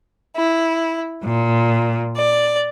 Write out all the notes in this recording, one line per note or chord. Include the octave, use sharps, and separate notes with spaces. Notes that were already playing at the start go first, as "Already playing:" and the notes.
E4
A#2
D5